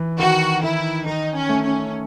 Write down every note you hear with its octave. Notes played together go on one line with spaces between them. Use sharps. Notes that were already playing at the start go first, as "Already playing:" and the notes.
Already playing: E3
D#3 F#4
D#3 E4
D#3 D#4
C#4
A3
C#4